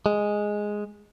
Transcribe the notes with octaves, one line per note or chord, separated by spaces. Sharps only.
G#3